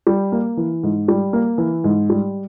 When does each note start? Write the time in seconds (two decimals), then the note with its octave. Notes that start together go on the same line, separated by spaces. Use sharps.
0.07 G3
0.32 A#3
0.57 E3
0.83 G#2
1.08 G3
1.33 A#3
1.58 E3
1.84 G#2
2.10 G3